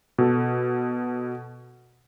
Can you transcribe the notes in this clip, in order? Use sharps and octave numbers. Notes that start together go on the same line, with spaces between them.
B2 A4